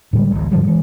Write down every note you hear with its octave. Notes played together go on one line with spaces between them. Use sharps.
A2 D3 G3 G#3
D1 A1
G#2 D3 F3 G3
E3 G#3